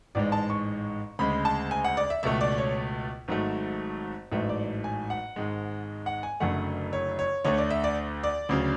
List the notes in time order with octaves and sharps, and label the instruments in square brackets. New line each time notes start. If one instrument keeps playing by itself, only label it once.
[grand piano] A1 G#2 G#3 D5
A5
C#6
D2 C#3 G#3 B5
A5
G#5
F#5
D5
E5
C#2 B2 A3 E5
D5
C#5
G#1 G#2 F#3 A3
A1 G#2 F#3 A3 E5
D5
G#5
F#5
G#1 G#2 G#3
F#5
G#5
F#1 F#2 D3 A3 F#5
C#5
C#5
D2 D3 A3 C#5
D5
E5
D5
D5
D2 C#3 F#3